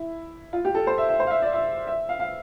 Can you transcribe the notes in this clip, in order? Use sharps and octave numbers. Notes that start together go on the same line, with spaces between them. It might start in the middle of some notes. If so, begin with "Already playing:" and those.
Already playing: E4
F4
G4
A4
C5
E5
E5
C5
F5
E5
D5
E5
E5
F5
F5